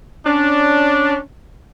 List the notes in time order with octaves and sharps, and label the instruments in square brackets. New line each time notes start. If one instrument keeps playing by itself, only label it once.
[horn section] C#4 D4